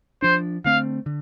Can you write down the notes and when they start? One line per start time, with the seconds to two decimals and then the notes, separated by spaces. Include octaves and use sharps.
0.22 F3 D4 C5
0.65 D3 A3 C4 F5
1.06 D3